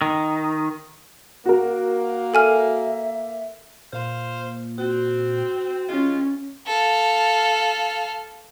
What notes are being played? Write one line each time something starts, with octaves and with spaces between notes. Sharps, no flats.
D#3
A#3 F#4 A#4
A4 E5 G#5 F6
A#2 C5 F5
C4 F#4
C#3 G#3 C#4 F4
A4 F5